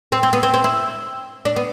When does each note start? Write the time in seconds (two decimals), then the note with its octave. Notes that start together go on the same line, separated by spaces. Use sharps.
0.12 C4
0.23 C4
0.33 B3
0.43 C4
0.54 C4
0.64 E4
1.45 D4
1.56 B3